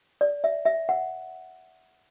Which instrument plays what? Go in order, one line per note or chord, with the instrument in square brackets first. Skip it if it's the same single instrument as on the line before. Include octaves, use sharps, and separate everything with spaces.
[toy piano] D5
E5
E5
F#5